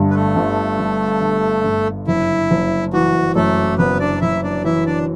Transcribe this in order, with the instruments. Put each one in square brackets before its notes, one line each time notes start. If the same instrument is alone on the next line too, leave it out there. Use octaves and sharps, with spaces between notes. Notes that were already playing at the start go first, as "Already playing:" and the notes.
Already playing: [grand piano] G1 G2 D3
[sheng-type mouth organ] B4
A3 A4
[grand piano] G1
G1
D3
G2
[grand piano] F#1 [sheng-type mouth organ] E4
[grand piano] F#1
[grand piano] E3 [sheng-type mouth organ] F#4
[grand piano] F#2 [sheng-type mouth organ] A3 A4
[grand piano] F#1 [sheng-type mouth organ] B3 B4
[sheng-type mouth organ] D4 D5
[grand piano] F#1 [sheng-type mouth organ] E4 E5
[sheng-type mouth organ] D4 D5
[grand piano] E3 [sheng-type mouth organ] E4 E5
[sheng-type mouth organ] D4 D5